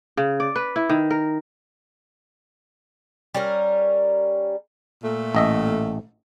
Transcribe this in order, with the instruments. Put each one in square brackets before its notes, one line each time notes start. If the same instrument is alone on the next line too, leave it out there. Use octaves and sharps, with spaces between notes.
[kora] C#3
D5
B4
E4
D#3
A#4
[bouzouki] G3 C#4 A#4
[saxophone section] A#2 A3
[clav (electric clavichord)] A1 D#5 E5